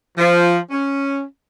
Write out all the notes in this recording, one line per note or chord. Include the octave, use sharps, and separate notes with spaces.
F3
C#4